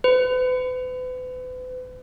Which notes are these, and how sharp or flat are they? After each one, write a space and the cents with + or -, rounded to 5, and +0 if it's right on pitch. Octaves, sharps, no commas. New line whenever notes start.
B4 +40